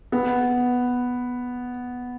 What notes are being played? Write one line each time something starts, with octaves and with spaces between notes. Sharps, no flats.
B3